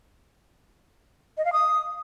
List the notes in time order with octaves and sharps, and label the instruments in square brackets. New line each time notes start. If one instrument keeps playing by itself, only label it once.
[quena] D#5
F5
D#6